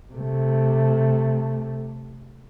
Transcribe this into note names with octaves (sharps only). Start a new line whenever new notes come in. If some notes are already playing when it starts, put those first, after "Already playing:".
C3 A3